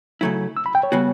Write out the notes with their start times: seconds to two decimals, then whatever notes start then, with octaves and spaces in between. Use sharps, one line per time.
0.21 C#3 F#3 A3 E4
0.57 E6
0.66 B5
0.75 G5
0.83 C#5
0.92 C#3 G3 B3 F#4